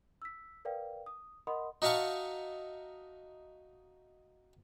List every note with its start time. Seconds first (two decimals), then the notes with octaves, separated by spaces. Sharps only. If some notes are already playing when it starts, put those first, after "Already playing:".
0.22 E6 B6
0.65 A#4 B4 D5 F5 G5
1.06 D#6
1.47 A#4 D#5 F#5 B5 C6 D#6
1.82 D#4 F#4 E5 F5 A5 C#6